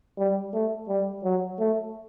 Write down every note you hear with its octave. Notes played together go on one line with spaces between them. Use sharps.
G3
A3
G3
F#3
A3